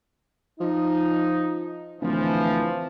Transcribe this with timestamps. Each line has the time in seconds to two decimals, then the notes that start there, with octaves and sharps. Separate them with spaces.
0.60 F3 D#4
2.01 D1 E3 F3